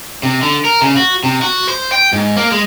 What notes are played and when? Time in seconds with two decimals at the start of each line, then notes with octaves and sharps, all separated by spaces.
0.23 C3
0.42 D3
0.65 A#4
0.82 C#3
0.97 F#4
1.24 C3
1.42 F#4
1.69 C5
1.92 G5
2.13 G#2
2.37 A#3
2.52 G#3